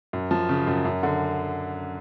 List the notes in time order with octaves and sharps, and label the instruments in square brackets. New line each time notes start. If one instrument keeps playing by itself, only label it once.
[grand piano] F#2
F3
C#3
F#2
F#2
D3